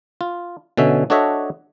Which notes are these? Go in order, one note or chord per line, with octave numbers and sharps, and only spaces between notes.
F4
B2 D3 C#4 E5
D4 F#4 A4 C#5 D#5 E5